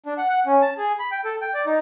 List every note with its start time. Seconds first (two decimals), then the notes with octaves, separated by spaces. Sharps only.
0.06 D4
0.18 F#5
0.30 F#5
0.46 C#4
0.62 A5
0.78 G#4
0.99 B5
1.12 G5
1.25 A4
1.41 G5
1.54 D5
1.66 D#4